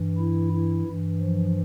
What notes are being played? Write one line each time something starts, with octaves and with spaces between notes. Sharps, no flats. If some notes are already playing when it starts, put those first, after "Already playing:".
Already playing: G2 E3
E4
E4
G2 E3
F3